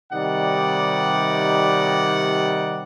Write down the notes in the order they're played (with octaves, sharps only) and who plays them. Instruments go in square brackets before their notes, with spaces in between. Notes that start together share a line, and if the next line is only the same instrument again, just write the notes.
[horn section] C3 D#3 G3 D#4 D5 F#5